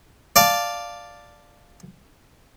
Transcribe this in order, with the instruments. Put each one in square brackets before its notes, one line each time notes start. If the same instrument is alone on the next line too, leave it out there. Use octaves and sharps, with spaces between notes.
[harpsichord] D5 F5 A5